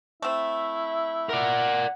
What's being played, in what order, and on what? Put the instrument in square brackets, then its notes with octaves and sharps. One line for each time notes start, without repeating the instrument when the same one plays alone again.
[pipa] A3 C4 [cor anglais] E4
[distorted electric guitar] A#4 D5 [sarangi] F#5